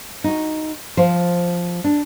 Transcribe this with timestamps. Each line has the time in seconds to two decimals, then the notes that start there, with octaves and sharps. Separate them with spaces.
0.24 D#4 F#4
0.97 F3 C5
1.84 D4